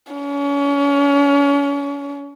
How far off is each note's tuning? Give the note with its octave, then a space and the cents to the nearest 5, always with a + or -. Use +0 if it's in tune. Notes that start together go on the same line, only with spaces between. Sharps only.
C#4 +35